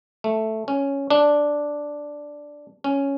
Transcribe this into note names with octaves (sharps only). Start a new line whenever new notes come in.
A3
C#4
D4
C#4